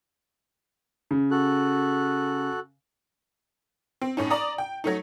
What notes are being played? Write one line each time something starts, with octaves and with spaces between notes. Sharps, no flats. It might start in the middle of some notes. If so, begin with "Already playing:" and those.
C#3
F#4 A4 F#6
C4
A2 C#4 D#4
D5 A#5 D#6
G5
F#3 A3 D#4